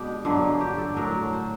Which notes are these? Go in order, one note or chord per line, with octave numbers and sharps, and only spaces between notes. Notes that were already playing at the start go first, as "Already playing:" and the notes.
Already playing: B2 G#3 B3 D4 G4
G2 D3 F#3 A#3 F4
G4
A4
A2 F#3 A3 D4 A#4
C5